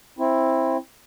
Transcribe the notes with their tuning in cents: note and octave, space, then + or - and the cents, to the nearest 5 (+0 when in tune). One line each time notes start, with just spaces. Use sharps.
C4 +15 E4 +0